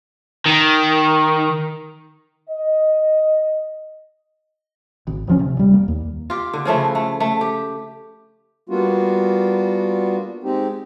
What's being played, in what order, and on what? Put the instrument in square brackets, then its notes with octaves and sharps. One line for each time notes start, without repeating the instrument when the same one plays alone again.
[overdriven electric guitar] D#3
[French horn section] D#5
[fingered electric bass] G#1
D#1 F3 C#4
C3
D#1 G3
A#3
D#2
[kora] F4 G4
D3
C#3 F3 A3 E4
A3
A3
G4
[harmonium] G3 A#3 B3 D4 F4 F#4
G#3 C4 D#4 G4